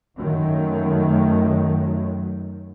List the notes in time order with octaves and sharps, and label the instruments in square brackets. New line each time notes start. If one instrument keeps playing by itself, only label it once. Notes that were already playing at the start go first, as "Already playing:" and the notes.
[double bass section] F#2 D#3 F#3 A3